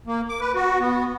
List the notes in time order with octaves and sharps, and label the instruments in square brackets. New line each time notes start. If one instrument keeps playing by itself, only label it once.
[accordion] A#3
D6
B4
F#4
B3